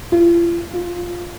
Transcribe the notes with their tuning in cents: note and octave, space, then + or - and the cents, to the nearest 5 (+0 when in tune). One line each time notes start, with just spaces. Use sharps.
F4 -40
F4 +5